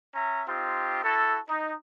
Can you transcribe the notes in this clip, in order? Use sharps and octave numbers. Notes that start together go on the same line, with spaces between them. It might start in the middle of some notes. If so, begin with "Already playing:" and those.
C#4 E5 A#5
C4 D#4 F4 G4
E4 F#4 A4
D#4